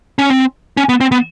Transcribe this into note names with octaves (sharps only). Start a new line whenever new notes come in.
C#4
C4
C#4
B3
C4
B3